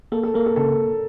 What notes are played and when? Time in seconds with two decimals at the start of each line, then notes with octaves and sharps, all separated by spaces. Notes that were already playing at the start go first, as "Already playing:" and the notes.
0.12 A#3 A4
0.23 A4
0.34 A#3 A#4
0.46 A4
0.56 C#3 A4